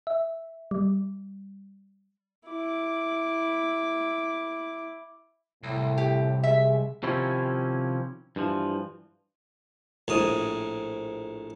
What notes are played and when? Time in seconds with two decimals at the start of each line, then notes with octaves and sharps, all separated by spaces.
0.07 E5
0.71 G3
2.48 E4 D6
5.63 C2 A2
5.98 G4
6.43 G#3 E5
7.03 C3 D#3 F3 C#4 E4 A4
8.36 G2 E3 F3
10.08 A#1 A2 D#6